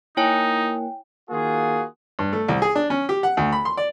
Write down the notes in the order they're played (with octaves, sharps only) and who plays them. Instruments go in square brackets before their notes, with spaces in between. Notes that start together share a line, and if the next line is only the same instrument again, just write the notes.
[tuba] A#3 [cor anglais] D#4 [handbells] E4 C#5 G#5 [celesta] G5
[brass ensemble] D#3 A#3 F4 F#4 G#4
[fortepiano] G2
A3
C2
G#4
D4
C#4
G4
F#5
D2
B5
C6
D5